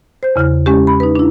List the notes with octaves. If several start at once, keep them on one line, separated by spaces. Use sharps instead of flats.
C5 G6
E2 C#3 E4 F6
G#3 C#4 G4
B5
D#4 B4
D4 E4